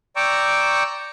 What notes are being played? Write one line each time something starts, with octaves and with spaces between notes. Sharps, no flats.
D5 G5 A#5 C#6 D6 E6